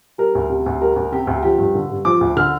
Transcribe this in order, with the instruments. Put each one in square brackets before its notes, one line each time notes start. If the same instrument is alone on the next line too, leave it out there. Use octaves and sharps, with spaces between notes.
[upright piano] G3 A#4
D2
C3
D2
G3 A#4
D2
C3 G4
D2
F3 G4
G2
D3
G2
F3 D6
D2
D3 F6